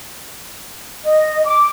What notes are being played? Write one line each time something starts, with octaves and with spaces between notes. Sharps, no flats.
D#5
D6